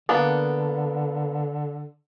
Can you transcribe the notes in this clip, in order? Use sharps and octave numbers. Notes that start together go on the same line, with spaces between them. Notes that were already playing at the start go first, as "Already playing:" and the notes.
D3 A#3 B3 D4